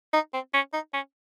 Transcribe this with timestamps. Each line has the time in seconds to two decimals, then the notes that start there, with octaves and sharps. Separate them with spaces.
0.13 D#4
0.33 C4
0.54 C#4
0.73 D#4
0.94 C#4